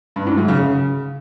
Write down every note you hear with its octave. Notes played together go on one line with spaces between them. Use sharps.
G2
G#2
F#2
C#3
C#3